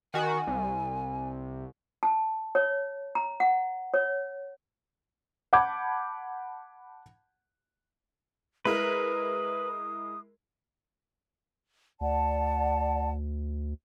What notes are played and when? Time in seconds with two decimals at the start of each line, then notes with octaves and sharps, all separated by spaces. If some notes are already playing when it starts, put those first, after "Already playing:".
0.14 D#3 F#4 G#5
0.47 C2
2.03 A5
2.55 C#5
3.15 A#5
3.40 F#5
3.94 C#5
5.53 F#5 A5 B5 D6 G6 G#6
8.65 G#3 E4 A#4 B4 D#6
12.01 D2 D5 F#5 A5